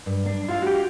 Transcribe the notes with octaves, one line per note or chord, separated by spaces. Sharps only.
G2
D4
E4 F4 F5
F#4 G4